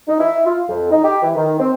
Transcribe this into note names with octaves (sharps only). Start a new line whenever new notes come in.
D#4
E4
F4
F2
D#4
G4
E3
D#3
C4